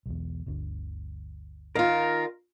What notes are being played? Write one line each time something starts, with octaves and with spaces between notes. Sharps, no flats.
B1 E2
G1 D2 D3
D#3 F4 A#4 F5